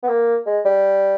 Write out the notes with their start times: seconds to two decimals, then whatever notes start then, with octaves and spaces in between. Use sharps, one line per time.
0.03 B3
0.09 A#3
0.46 G#3
0.65 G3